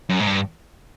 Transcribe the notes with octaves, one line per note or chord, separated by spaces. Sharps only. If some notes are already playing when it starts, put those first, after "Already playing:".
F#2
G#2
G2